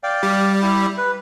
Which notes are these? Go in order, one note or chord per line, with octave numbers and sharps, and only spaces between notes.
D5 F5 G5
G3
E4 G4
B4